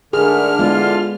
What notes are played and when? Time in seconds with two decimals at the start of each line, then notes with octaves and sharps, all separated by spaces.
0.13 G#2 D3 A3 G#4 A#4 F6
0.59 G#3 B3 D4 E4 F4